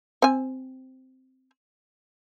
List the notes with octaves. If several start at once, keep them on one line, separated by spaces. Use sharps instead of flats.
C4 G#5